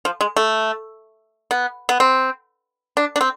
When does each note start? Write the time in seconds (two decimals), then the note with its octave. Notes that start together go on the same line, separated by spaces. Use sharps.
0.05 F3
0.21 G#3
0.37 A3
1.51 B3
1.89 B3
2.00 C4
2.97 D4
3.16 D4
3.21 C4